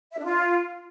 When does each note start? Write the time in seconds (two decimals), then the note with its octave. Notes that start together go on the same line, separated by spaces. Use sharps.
0.12 E5
0.18 D4
0.24 F4